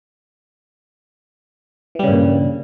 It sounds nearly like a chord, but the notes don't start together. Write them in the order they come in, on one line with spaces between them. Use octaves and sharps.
E3 G3 C#3 G2 A#2